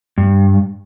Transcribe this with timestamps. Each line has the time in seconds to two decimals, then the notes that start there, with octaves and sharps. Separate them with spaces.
0.18 G2